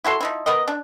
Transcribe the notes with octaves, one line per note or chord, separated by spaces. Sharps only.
E4 F#4 A4 C6
F3 D#4 E4
B3 A#4 B4 D#5
D4